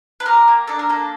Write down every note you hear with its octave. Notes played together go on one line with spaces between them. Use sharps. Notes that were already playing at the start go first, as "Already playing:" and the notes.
B4
G4 A#4
A#3
D4 A4
A#4
A#3 A4